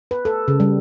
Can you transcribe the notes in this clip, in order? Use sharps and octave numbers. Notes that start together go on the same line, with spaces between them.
B4
A4
C#3
G3